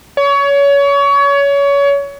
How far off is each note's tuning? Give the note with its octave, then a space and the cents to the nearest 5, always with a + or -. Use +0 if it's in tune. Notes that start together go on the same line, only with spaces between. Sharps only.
C#5 +25